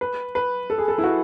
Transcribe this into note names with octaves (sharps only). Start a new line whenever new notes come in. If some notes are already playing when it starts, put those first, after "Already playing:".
B4
B4
A4
G#4
A4
E4
F#4